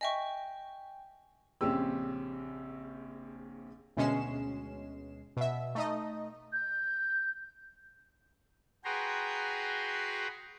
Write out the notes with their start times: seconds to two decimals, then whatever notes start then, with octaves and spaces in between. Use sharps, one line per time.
0.01 D#5 E5 G5 G#5 C#6
1.61 A#1 C#3 C4 C#4 G4 E6
3.97 D2 B2 G#3 C#4 C7 E7
5.37 B2 E5
5.75 A3 D#4 D#5
6.53 G6
8.85 F#4 G#4 B4 G5 A#5 C6